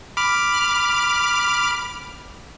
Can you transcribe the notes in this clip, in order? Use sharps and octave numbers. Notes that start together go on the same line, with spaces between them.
B5 D6 F6